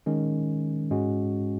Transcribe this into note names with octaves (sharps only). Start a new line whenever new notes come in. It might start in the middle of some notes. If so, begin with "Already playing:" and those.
D#3 G#3 C#4
G#2 G#3 C#4 F#4